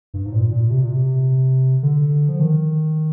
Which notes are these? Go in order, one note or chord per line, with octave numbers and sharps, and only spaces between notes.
G2
G#2
A#2
A#2
C3
A#2
C3
D3
F3
D#3